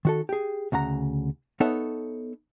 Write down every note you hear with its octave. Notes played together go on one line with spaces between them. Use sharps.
D#3 F#4 A4
G4 G#4
D2 C#3 F#5 A#5
B3 D#4 A4 C#5 E5 F#5